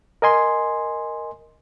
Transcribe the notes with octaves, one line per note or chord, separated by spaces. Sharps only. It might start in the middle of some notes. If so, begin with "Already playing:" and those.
A#4 D#5 G#5 C6